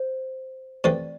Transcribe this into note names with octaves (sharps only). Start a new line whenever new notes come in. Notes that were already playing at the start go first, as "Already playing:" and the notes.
Already playing: C5
C3 E3 A3 C4 D5